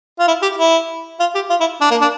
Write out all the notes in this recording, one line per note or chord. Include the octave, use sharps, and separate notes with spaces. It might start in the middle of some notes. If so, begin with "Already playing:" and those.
F4
E4
G4
E4
F4
G4
F4
E4
D4
A#3
D4